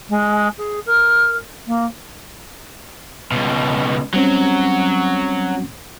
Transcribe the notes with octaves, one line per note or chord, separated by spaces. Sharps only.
G#3
G#4
A#4
A#3
C#2 B2
F#3 G3 C4 C#4